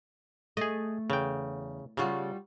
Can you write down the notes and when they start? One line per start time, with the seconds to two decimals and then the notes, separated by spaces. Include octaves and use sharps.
0.57 A3 G#4 D#5
1.10 E2 C#3 G5
1.97 C#3 G3 F4 F#4